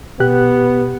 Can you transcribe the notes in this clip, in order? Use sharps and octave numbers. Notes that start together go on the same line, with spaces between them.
B2 B3 G4 F#6